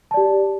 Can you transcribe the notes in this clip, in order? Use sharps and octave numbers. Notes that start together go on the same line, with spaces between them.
G4 D5 A5